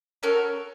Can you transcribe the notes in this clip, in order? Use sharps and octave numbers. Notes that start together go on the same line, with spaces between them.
C#4 F#4 A4 A#4